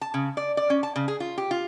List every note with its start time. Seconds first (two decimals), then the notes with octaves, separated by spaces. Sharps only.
0.01 A5
0.14 C#3
0.37 D5
0.57 D5
0.70 C#4
0.83 A5
0.96 C#3
1.08 G#4
1.20 F4
1.38 G4
1.51 F4